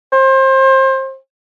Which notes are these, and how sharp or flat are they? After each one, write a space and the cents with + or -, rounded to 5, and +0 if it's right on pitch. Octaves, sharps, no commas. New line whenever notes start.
C5 +30